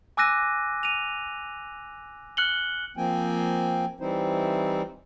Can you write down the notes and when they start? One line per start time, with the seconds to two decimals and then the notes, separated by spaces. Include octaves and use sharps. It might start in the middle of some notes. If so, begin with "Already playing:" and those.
0.17 G#5 D6 E6 F#6 A#6 D#7
0.83 D#7 F7
2.37 F6 F#6 C#7 F#7 G7
2.97 F3 A#3 C4 G5 G#5
4.00 E3 G3 C4 D#4 E4 C5